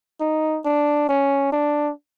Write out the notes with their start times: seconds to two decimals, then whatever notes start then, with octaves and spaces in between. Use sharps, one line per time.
0.20 D#4
0.65 D4
1.09 C#4
1.52 D4